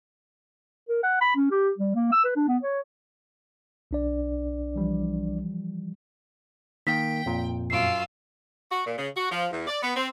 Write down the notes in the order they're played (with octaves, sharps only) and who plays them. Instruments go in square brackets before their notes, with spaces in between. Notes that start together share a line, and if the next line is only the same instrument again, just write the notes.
[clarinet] A#4
F#5
B5
C#4
G4
G3
A#3
E6
B4
D4
B3
C#5
[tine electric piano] B1 D4 D5
[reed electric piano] E3 F3 G3
[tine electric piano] D#3 A#3 [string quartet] G5 [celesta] B6
[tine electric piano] F2 A#2
[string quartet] F#2 F4 E6 [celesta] C7 D7
[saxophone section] F#4
A#2
C#3
F#4
F3
E2
D5
B3
C4